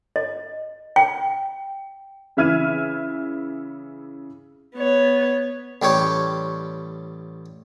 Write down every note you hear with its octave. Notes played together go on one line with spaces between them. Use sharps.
D#5
G5
C#3 E3 E5 F6 G#6 D#7
B3 C#5
A1 G3 G4 C#5